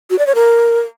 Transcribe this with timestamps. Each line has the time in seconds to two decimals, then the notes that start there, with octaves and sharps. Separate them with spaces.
0.10 F#4
0.18 D5
0.27 C#5
0.35 A#4